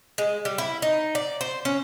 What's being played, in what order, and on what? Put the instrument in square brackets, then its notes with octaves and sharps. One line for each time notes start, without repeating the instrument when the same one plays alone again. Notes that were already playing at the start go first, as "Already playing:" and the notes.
[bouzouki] G#3
G3
E4
D#4
D5
C5
C#4